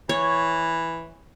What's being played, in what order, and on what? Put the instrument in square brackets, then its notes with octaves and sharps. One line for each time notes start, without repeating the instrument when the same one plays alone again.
[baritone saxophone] E3 [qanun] C#5